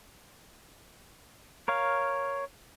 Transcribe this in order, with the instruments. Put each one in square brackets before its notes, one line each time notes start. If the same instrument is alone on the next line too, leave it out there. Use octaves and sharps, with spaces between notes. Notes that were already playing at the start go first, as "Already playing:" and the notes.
[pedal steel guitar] A#4 C#5 F5